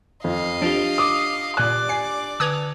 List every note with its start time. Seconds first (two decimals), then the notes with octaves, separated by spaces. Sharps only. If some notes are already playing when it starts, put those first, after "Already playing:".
0.24 F2 D#5 F5
0.62 F3 D4 F4 G4
0.98 D6 D#6
1.57 A#2 D5 G#5 D6 F#6
1.89 G#5 C7
2.40 D3 B4 D#6 F#6 G#6 F7